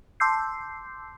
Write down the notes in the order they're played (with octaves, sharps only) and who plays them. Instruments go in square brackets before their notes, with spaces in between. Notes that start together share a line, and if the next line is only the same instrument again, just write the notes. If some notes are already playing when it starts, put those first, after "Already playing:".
[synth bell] A5 C6 D6 E6 G6 C7